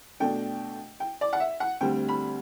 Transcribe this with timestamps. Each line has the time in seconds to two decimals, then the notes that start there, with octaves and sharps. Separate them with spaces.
0.20 B2 A3 D4 G5
1.00 G5
1.21 D5
1.33 F#5
1.40 E5
1.60 F#5
1.81 D2 D3 G3 C4 G5
2.09 B5